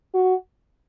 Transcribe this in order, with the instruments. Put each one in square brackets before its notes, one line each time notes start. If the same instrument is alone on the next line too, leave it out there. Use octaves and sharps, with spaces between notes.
[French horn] F#4